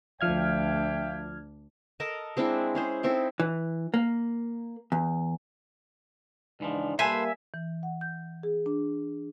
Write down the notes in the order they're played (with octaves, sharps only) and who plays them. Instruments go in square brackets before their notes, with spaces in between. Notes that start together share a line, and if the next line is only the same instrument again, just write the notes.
[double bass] D2 D4 [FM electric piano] F3 F6 G#6 [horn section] E5 F5 G5
[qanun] A4 A#4 D#5 A5
G#3 C4 D4 E4
C#4 G#4 C5
C4 D#4 E4 A4
[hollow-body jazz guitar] E3
A#3
E2
[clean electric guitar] C#2 E3 F3 [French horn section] G#2 D4 D#4
[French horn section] G3 A#3 [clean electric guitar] A4 B4 C5 [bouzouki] E5 G#5
[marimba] E3
F#5
G6
G#4
D4